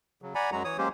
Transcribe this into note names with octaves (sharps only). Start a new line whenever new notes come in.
C#3 F#3
D5 F#5 G#5 A#5 B5
F#2 F#3 G#3 F#4 A#5
E3 C#5 D#6
F#3 G#3 A#3 C#4 G4 C5